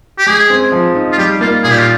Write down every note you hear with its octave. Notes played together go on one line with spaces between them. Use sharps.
G4
G#3 G#4
C4
F3
D#4
F4
G3 G4
A#3 F4
A#2 G#4
G4
F4